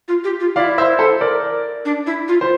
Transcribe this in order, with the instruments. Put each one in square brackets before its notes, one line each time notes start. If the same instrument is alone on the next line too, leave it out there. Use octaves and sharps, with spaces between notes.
[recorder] F4
G4
F4
[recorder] E4 [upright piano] D5 F5
[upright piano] C5 E5
A4 C5
A#4 D5
[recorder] D4
E4
F4
[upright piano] C5